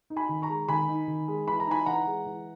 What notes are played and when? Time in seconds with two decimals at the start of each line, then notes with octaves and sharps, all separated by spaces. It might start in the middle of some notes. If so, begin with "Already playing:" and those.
0.10 D#4
0.16 G#5 B5
0.29 D#3
0.42 A#5 C#6
0.49 G#3
0.68 D#3 G#5 B5
0.89 D#4
1.08 D#3
1.28 G#3
1.47 E3 B5
1.60 A#5
1.67 D#4 G#5 B5
1.86 E3 F#5 A#5
2.07 G#3
2.26 E3